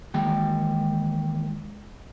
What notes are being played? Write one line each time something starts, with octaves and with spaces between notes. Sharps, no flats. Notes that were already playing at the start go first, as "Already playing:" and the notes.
D#3 E3 G#3 A#3 G5